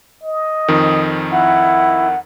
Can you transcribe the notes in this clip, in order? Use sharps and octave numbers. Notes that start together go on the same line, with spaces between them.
D#5
F2 D#3
E4 F#5